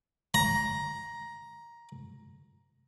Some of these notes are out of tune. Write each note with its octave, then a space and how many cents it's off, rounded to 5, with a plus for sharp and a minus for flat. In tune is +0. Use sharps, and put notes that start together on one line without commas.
A#5 +10